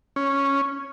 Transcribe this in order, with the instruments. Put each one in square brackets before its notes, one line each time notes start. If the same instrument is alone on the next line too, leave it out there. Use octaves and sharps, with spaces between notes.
[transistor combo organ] C#4